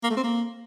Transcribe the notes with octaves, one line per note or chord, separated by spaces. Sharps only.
A#3
A3
C4
A#3